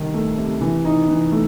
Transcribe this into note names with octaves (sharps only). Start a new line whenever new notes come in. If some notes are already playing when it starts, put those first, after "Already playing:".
Already playing: C2 D#3
A3
C3
E3
D#4
E3
A3